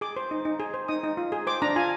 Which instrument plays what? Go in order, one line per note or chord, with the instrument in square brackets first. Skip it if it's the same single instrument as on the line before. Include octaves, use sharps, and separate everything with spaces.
[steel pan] G#4 D6
C5
D#4
D#4
G#4
C5
D#4 D#6
D#4
F4
G#4
C5 D6
D4 A#5
F4 G#5